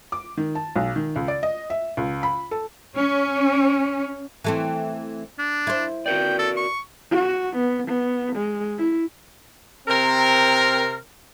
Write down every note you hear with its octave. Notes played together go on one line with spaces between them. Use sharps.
D6
D#3
A5
B1
D#3
C#2
D5
D#5
E5
C#2
B5
A4
C#4
E3 A3 C4
D4
E4 C5
F#4 A#4 D5 G5
A4
C#6
F#4
B3
B3
G#3
E4
C3 C4 A#4